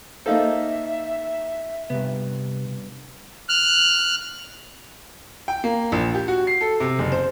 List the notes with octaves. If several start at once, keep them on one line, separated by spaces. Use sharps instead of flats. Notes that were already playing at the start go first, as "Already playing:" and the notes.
A#3 D#4 A4 C5 E5 F5
G2 C3 B3
F6 F#6
G5
A#3
A#1
G4
F#4
C7
A4
C3
F#1
C5